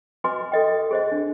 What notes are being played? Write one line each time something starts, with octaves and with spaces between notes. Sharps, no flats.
F#4 B4 D#5 G#5 C6 D6
A4 D#5 G5
G#4 C5 D#5
D4